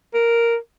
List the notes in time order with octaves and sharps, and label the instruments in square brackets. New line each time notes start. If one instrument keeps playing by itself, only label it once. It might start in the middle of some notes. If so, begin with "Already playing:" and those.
[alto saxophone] A#4